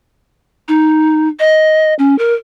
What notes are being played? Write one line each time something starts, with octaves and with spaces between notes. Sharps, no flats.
D#4
D#5
C#4
A#4